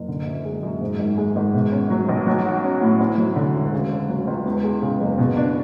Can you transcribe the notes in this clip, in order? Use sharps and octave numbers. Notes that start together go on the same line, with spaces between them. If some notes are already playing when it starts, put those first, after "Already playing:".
Already playing: F#1
D3
F#2
G#3
F#2
G#2
G#1
G#3
G#1
B2
C#4
F#3
B1
F#3
F#4
C#4
A2
D2
F#3
D3
E1
C#3
C#4
F#3
C#2
E2
G#3
C#3
F#1
B2
D4